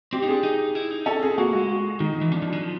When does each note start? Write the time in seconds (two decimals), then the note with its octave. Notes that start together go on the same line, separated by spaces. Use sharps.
0.13 C4 G4
0.23 D#4
0.28 D4 G#4
0.43 D#4
0.75 E4
0.91 D#4
1.06 C#4 A4
1.22 C4 G#4
1.38 A#3 F#4
1.53 G#3 F#4
1.69 F#4
2.00 D#3 D#4
2.16 D#4
2.21 E3
2.32 F3 D4
2.42 F3
2.48 F#3 D4
2.63 F3